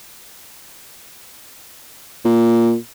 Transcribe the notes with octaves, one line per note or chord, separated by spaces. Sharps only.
A#2